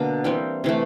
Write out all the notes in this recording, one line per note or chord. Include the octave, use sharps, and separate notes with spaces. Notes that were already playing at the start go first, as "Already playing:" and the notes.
Already playing: B2 D3 A#3 D4
E3 G3 C4
C3 E3 A3